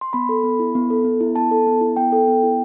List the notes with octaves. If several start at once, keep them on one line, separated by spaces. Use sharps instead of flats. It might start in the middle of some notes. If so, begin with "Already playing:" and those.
C6
B3 B5
A4
B3
E4
B3
A4
B3
E4
B3 A5
A4
B3
E4
B3 G5
A4
B3
E4